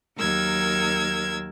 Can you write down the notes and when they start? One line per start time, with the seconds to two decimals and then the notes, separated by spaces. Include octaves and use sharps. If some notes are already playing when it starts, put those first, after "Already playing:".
0.18 D#2 F#3 A#4 E6 G#6